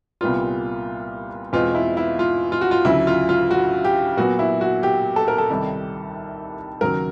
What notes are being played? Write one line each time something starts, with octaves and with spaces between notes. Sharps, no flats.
C2 A#2 G3 B3 F4
E2 B2 G#3 C4 F4
E4
E4
F4
F4
F#4
F4
D2 C#3 F#3 E4
F4
F4
F#4
G4
A#2 F#3 B3 F#4
E4
F#4
G4
A4
A#4
A4
C2 C3 D#3 G3
D#2 C#3 F#3 A#4